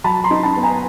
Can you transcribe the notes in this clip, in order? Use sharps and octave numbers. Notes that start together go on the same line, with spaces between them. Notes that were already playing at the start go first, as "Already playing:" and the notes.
F#3 A5 B5
A#5 C6
D#4
A5 B5
B3
G#5 A#5